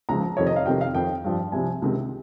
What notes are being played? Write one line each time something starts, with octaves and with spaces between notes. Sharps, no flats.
C#2 C#3 F3 A#5
F2 C3 D#3 C#5
D#5
F5
F2 C3 D#3 G5
F5
F2 D#3 G5
G2 F3
C2 C3 F3 G#5
C#2 C3 D#3